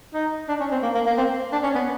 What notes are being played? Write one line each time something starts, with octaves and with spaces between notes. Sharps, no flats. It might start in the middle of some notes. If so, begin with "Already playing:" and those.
D#4
D4
C#4
C4
A#3
A#3
A#3
C4
D4
C#4
B3